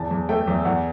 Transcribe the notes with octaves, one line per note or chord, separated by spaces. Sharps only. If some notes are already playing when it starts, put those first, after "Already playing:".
Already playing: E2 A5
E2
A3 G5
E2
E2 F#5